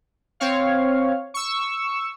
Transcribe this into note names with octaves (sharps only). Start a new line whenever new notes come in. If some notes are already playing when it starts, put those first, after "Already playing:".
C4 C#5 F5
C#6 E6